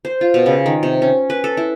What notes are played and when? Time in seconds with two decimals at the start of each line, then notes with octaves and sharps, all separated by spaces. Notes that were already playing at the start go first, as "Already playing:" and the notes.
0.05 C5
0.21 F4
0.34 B2
0.46 C#3
0.66 D#3
0.83 C3
1.02 C#4
1.30 B4
1.44 A4
1.57 E4